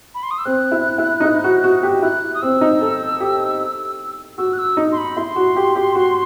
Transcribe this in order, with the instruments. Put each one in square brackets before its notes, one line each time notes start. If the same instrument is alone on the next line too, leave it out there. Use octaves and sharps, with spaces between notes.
[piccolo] B5
C6
D#6
E6
[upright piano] C4 [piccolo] F#6
[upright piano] E4
E4
D#4
E4
F#4
F#4
G4
[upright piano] E4 [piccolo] F#6
[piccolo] D#6
[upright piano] C4 [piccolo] E6
[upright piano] D#4
A4
G4
[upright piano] F#4 [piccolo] E6
[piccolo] F#6
E6
[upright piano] D#4
[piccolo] C6
B5
[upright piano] E4 [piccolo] C6
[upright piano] F#4
G4
G4
F#4